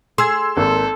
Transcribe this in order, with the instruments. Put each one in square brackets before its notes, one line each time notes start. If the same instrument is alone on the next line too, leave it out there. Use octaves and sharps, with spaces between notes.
[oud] G#4 [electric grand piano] C6 E6 G#6
[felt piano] G#1 A#3 [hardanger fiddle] A4